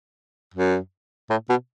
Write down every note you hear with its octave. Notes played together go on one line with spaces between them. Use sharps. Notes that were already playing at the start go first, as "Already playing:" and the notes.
F#2
A2
B2